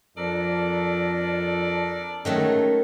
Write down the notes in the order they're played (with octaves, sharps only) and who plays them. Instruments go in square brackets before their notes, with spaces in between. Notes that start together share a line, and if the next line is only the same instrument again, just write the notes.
[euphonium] F2 [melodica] D4 A4 A#4 [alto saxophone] D5
[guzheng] D#3 F#3 A3 [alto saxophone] G#3 [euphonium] C#4 [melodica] A4